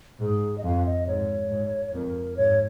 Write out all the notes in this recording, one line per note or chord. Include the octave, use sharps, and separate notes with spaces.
G#2 G#4
D#5
F2 F5
D#5
G#2 C#5
G#2
F2 A#4
G#2 C#5